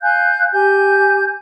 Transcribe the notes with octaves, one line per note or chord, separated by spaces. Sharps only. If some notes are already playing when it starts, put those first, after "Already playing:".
F5 G#5 F#6 G6
G4 G#5 G6